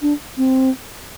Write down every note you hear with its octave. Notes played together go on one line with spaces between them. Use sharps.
D4
C4